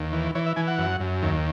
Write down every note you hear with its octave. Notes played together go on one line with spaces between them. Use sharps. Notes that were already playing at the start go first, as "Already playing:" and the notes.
Already playing: D#2
E3
E3 C#5
E5
E3 G#5
F#5
F#2
F#2
D#2